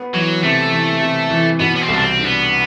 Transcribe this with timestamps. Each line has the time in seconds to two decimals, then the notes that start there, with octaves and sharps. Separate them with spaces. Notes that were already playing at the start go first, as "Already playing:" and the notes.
Already playing: B3
0.14 E3 F#3
0.43 C3 A3
0.72 E3
1.01 C3
1.30 E3
1.60 B2 B3
1.76 B3
1.81 C4
1.88 C2 D4
2.03 C4
2.18 D4
2.26 B3